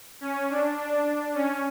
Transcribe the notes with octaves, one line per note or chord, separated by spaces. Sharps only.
C#4
D4
D4
C#4